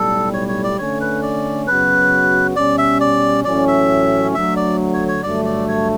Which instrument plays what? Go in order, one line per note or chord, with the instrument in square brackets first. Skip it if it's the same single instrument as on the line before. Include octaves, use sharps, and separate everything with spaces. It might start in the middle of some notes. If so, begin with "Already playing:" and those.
Already playing: [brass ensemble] B1 A2 G3 [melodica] A4
[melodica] C#5
C#5
D5
[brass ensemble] D3 A3 C#4 [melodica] C#5
[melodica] B4
D5
[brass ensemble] F#2 C#3 F#3 B3 F#4 [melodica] B4
[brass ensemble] B2 G3 C#4 [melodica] D5
[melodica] E5
D5
[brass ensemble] A1 A2 F#3 C#4 [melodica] D5
[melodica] E5
[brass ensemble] D2 D3 F#3 A3 [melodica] E5
[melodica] D5
C#5
C#5
[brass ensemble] G2 D3 F#3 A3 [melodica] D5
[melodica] D5
C#5